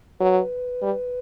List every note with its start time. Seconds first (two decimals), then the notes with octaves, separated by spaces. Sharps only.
0.20 F#3 B4
0.82 G3